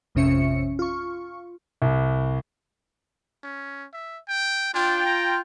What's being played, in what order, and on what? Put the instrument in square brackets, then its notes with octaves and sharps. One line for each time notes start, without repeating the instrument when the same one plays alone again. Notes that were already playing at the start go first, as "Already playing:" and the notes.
[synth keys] A1 F2 C3 C#4 E5 C#7
F4 C#6
[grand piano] C2
[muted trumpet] C#4
E5
G5
[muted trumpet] D4 [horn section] F4 G5
[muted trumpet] A#5